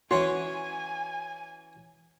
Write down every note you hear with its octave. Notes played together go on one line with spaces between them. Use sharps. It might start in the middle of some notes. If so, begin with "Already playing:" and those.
E3 C#4 F#4 C#5 G#5 C6